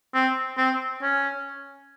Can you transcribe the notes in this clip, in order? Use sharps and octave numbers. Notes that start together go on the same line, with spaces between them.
C4
C4
C#4